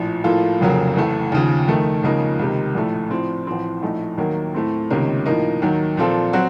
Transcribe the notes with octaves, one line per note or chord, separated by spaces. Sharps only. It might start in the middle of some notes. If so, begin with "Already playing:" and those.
Already playing: A#1 A2 F3
A2 F3 A#3 F4 A4
F1 F2 C#3 F#3 A#3
A1 A2 A3
D#2 C#3 F3
F2 D#3 A3
C#2 C#3 F3 A#3 D#4
C#2 C3 D#3
A#1 A2 A3
A2 F3 C4
A1 A2 F3 C4
A#1 A2 A3 D#4
D#2 D#3 F#3 A#3
A2 A3 C4
C#2 C3 D#3 A#3 C#4
A2 F3 A#3 D#4
D#2 D#3 F#3
A#2 F3 C4 F4 A4
F#3 C4 F#4